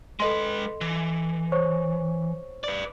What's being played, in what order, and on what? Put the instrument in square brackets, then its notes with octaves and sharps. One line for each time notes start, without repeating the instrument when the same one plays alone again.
[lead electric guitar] G#3 B4 [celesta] A4 D#5 C6
[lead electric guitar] E3
[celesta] C5 C#5 C#6
[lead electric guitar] B4 D5